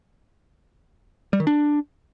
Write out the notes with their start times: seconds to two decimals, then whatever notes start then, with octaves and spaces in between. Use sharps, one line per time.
1.33 G3
1.40 D#3
1.47 D4